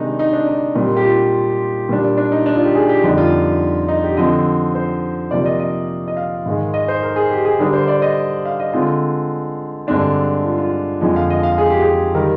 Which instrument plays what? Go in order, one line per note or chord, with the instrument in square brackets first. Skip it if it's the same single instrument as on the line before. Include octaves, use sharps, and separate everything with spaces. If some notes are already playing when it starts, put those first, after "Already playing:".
Already playing: [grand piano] C3 D#3 G#3 D4 D#4
D#4
D4
D#4
A#2 G3 C4
G4
F4
A#2 G3 D4
D4
D#4
D4
F4
G4
G#4
G4
F2 D3 G3 D4 D#4
F4
D#4
G4
D3 F3 C4 D#5
C5
C3 F3 A#3 D5
D#5
D#5
D#5
F5
G#2 D#3 G#3
D#5
C5
A#4
G#4
G4
G#4
D3 G3 D4 A#4
C5
D5
D#5
F5
D#5
D3 G#3 C4 F4
G2 D3 G#3 C4 D4
F4
F4
F2 D3 F3 G#3
F5
D#5
F5
G#4
G4
G#4
D#3 G3 A#4